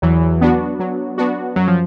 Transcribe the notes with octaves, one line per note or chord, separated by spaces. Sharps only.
E2 E3 F#3
B3 D4 F#4
F#3
B3 D4 F#4
F#2 F#3
F3